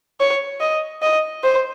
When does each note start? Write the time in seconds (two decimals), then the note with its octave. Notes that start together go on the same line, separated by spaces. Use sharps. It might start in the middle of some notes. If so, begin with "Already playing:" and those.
0.20 C#5
0.61 D#5
1.02 D#5
1.44 C5